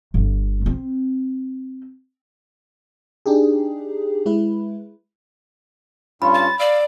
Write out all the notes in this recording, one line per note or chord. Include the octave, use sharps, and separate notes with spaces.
G1
C4
D4 D#4 G4 G#4
G#3 E4 B4
G2 C#4 F4 B5
A6
D5 F5 E6